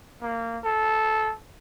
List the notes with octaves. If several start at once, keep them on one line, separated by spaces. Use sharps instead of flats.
A#3
A4